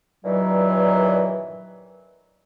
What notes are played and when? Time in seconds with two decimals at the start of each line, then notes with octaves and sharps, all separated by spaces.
0.24 G2 A#2 D#3 E3 F#3